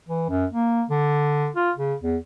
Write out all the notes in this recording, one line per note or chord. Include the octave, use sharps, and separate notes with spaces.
E3
F#2
A#3
D3
F4
C#3
E2